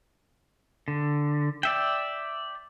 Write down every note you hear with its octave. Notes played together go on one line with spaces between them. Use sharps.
D3
D5 E5 G5